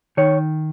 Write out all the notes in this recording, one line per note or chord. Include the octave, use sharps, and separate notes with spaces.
D#3 C#5